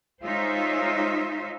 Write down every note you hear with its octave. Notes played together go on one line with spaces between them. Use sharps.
G#3 D#4 F4 C5 C#5 E5